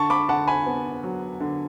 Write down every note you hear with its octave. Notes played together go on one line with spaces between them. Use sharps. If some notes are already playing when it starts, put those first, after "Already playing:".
Already playing: D3 A5 C#6
B5 D6
D3 F#5 A5
G#5 B5
B3
F#3
D3